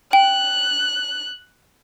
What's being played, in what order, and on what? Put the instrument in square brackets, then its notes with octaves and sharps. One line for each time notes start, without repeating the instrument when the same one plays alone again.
[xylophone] G5 [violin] F#6